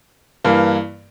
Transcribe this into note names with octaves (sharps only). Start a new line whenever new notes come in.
G2 E3 A#3